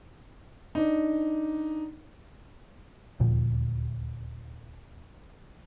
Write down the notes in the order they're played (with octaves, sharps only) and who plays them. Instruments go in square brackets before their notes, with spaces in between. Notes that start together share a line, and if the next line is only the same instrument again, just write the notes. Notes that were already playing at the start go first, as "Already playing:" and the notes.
[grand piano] D4 D#4
[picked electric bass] D#1 D2 A#2 F3